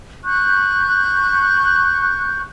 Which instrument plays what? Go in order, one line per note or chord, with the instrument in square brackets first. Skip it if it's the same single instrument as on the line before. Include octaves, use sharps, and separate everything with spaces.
[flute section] C#6 F#6 G6